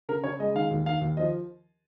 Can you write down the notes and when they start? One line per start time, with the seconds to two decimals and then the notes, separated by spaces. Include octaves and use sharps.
0.09 C#3 A#4
0.24 C#3 C#5
0.39 G#3 D#5
0.55 D#3 F5
0.71 D#2
0.86 D#3 F5
1.01 D#2
1.17 F3 D#5